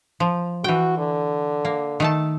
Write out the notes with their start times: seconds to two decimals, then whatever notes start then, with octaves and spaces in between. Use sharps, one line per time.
0.20 F3
0.64 E3 F#4 G5
0.97 D3
1.65 A#3
2.00 D#3 A3 A5